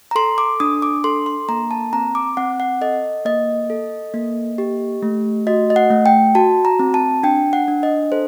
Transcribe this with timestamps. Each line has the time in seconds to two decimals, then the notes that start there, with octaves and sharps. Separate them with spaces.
0.11 A#5
0.15 A4 C6
0.38 D6
0.60 D4 D#6
0.82 D6
1.04 A4 C6
1.26 C6
1.49 A#3 A#5
1.71 A5
1.93 C4 A#5
2.15 D6
2.37 C4 F#5
2.60 F#5
2.81 A4 D#5
3.25 A#3 D#5
3.70 A4
4.14 A#3
4.58 G4
5.02 A3
5.47 F#4 D#5
5.70 D#5
5.76 F#5
5.90 A3
6.06 G5
6.35 F#4 A5
6.65 A#5
6.79 C4
6.94 A5
7.23 D4 G5
7.53 F#5
7.68 D4
7.83 D#5
8.12 A4 C5